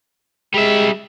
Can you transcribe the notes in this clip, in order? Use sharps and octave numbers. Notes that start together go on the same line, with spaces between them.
G3 G#3 E5